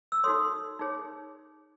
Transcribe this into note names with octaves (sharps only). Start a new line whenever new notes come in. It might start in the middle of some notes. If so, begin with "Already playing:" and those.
E6
D#4 F#4 A4 C#5 C6 D#6
D#4 G#4 C#5